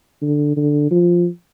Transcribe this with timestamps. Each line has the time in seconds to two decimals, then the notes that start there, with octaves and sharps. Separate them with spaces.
0.22 D3
0.56 D3
0.91 F3